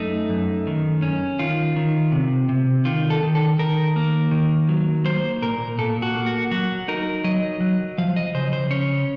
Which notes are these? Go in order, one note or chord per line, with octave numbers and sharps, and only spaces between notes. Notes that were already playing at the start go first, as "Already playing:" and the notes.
Already playing: F#2 A3 D#4
F#2
D#3
C#4
D#3 F4
D#3
C3
C3
D#3 F4
A4
D#3
A4
D#3 A#4
A#3
D#3
F#3
A#3 C5
A#2 A#4
A#2 A4
F#4
A#3
F#4
F#3 F#4
D#4 A#4
F#3 D#5
F#3
F3 F5
D#5
C#3 C5
C5
C#4 C#5